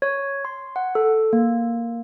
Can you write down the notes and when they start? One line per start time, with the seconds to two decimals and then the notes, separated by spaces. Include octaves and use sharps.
0.02 C#5
0.45 C6
0.76 F#5
0.95 A4
1.33 A#3